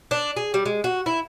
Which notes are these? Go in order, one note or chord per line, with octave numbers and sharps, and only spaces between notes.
D4
G#4
G3
G#3
F#4
E4